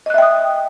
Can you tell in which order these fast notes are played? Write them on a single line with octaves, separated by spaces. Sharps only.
D#5 F#6 E5 G5 D#6